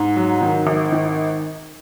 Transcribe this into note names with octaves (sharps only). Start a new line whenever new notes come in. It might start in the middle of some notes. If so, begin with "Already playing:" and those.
Already playing: G#2
F#3
D#3
G#1
D#3